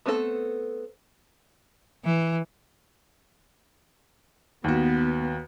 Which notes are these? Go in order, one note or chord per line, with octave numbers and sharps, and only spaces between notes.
A3 B3 C4 D4 A4
E3
D#2 B3 F#4